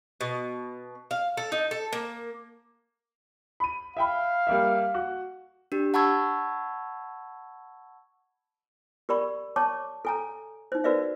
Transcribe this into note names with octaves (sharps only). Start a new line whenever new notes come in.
B2
F5
A4
D#4
A4
A#3
B5 D#7
E5 F5 G5 B5
G3 A#3 E5
F#4
D4 G4
F#5 A5 B5 C#6 E6 G#6
G4 A#4 D5 B5 C#6
C#5 A5 C#6 D6
A4 G#5 A#5
D#4 C5
F#4 A#4 B4 D5 E5 F5